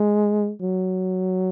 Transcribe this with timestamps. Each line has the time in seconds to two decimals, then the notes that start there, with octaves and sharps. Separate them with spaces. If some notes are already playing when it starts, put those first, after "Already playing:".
Already playing: G#3
0.62 F#3